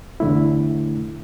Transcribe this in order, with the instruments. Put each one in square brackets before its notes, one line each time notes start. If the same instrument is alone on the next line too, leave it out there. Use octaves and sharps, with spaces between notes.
[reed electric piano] E2 D3 A3 E4